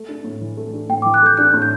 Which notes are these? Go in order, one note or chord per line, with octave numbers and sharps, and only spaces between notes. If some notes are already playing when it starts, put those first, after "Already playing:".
Already playing: A3
D4
A2
E3
A3
D4
A2 G5
D6
E3
F#6
A3 G6
D4 F#6
A2
G6